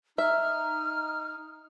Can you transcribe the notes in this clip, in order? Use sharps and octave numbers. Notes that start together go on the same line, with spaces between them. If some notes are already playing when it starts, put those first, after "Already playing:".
D#4 E5 F6